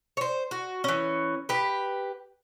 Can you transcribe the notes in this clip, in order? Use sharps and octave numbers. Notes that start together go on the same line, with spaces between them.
C5 C#5
F#4
E3 C#4
G4 B4